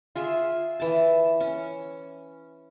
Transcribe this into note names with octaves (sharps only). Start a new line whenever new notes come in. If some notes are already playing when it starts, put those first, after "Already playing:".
F4 G#4 E5
E3 A5
C#4